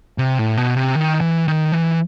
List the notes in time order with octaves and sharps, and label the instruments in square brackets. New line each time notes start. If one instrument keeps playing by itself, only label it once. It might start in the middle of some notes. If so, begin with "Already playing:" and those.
[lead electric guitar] C3
A2
B2
C3
D#3
E3
D#3
E3